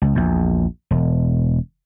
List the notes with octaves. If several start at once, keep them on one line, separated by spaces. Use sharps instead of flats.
C#2
A#1 E2
E1